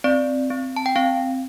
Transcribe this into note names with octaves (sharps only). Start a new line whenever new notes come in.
C4 D5
C4
A5
G5
C4 F5